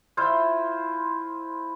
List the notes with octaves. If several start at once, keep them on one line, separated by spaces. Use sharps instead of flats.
E4 F4 C5